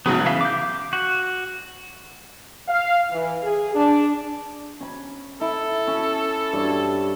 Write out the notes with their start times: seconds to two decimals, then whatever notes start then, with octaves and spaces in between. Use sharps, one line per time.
0.06 G#1 C#3 F#3 B3
0.25 C#3 E3 E5 F5
0.41 D6 G6
0.93 F#4
2.68 F5
3.11 E3
3.43 G#4
3.75 D4
4.80 C#4 B5
5.41 E4 A4
5.87 C#4
6.53 G2 C#5